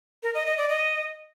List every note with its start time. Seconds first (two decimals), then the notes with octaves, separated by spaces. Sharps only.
0.23 A#4
0.34 D#5
0.46 D#5
0.58 D5
0.69 D#5